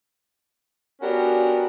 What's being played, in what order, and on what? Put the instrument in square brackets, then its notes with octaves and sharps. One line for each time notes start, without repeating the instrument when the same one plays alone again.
[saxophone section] B3 C#4 D4 F#4 G4 A#4